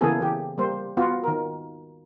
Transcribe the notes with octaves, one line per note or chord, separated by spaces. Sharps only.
C#3 E3 A#3 B3 G#4 A4
E3 G4
G3 A#3 C5
B3 F4 F#4
D#3 A#4